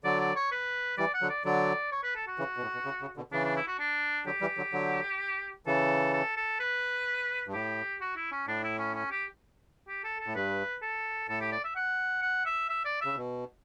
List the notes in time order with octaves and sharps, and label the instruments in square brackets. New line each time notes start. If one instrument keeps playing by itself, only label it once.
[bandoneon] D3 F#3 [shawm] D5
[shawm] D5
C#5
B4
[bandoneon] E3 G3 [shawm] D5
[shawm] F#5
[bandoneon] D3 F#3
[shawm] D5
[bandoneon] D3 F#3 [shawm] D5
[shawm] C#5
B4
A4
F#4
[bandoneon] C#3 E3
B2
A2
B2
C#3
C#3
B2 D3
[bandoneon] C#3 E3 [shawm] D4
[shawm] D4
E4
F#4
D4
[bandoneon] D3 F#3 [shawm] G4
[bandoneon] E3 G3
D3 F#3
D3 F#3
[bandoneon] C#3 E3 [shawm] A4
[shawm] A4
A4
B4
[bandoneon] G2
[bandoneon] A2 [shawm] G4
[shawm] F#4
E4
C#4
[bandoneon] A2 [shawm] D4
[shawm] E4
C#4
C#4
G4
G4
A4
A4
[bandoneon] A2
[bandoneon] G2 [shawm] B4
[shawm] A4
[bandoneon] A2 [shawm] A4
[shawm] G4
D5
E5
F#5
F#5
E5
E5
D5
[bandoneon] C#3 [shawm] E5
[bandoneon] B2